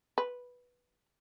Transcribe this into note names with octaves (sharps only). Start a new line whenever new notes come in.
B4